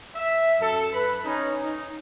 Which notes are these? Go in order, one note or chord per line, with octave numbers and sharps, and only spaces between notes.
E5
F#2 A4
B4 B5
C#4 D#4
D#4